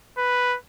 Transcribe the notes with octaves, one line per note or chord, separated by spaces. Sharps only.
B4